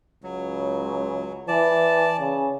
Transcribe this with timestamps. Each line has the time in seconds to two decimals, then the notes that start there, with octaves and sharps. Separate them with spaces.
0.24 C#2 F#3
1.48 E3 D5 A5
2.20 C#3